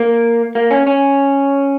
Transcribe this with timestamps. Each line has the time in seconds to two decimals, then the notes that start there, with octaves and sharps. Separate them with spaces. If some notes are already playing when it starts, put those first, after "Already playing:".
Already playing: A#3
0.55 A#3
0.71 C#4
0.87 C#4